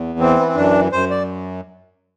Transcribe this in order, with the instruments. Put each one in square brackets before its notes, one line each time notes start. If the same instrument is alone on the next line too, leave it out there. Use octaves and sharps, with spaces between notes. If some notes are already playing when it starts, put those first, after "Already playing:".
Already playing: [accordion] E2
E3 C4
B3
C4
F#2 D4
F#2 C5
D5